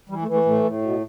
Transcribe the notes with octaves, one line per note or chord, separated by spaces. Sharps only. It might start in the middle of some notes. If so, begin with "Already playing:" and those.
E3 G3
A3
E3
A3
A2 A3
A2
B2